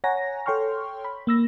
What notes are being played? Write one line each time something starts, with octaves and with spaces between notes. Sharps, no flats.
C#5 F#5 G#5 A#5 A#6
A4 C#5 G5 C6 C#6 F6
B5
A#3 E6 A#6